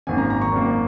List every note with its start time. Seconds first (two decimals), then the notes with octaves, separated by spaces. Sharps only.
0.07 G#1 F#2 D#3 A#3 G#5
0.18 A#5
0.30 A#5
0.42 C#6
0.52 G#1 F#2 D#3 A#3